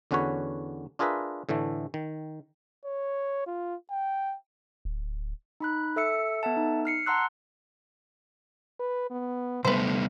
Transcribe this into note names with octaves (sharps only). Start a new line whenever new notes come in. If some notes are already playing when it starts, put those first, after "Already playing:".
E2 D3 C#4 F#4 B4 C#5
D4 F4 G#4 A#4 B4 E5
A2 D3 E3 A3
D#3
C#5
F4
G5
D1
D#4 B5 F#6
A4 E5 E6 C#7
B3 A4 E5 F#5 A5
D#4
F6 C7 C#7
F#5 A5 A#5 C6 E6 F#6
B4
B3
C3 G3 A3 B3 B4 C5